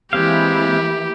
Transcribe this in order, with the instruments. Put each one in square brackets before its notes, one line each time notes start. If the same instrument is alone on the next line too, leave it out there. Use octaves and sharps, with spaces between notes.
[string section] E3 A#3 E4 [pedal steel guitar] G#3 C4 F5 [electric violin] G4